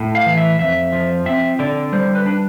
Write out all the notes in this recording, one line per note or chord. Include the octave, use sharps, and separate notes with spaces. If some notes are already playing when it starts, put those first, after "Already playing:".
Already playing: A2
F5
E3
E5
F2 E5
F3
C4 E5
D3 D5
G3 C5
B4
D4